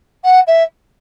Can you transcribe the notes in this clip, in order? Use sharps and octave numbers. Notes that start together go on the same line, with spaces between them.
F#5
E5